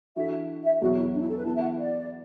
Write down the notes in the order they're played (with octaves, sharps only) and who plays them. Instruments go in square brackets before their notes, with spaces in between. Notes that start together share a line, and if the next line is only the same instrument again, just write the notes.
[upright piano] E3 D4 F#4 A4 [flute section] E5
[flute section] E5
[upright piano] E2 B2 F#3 [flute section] F#4
[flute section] E4
D4
E4
A4
B4
[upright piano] E3 B3 E4 [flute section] A5
[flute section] E5
F#5
D5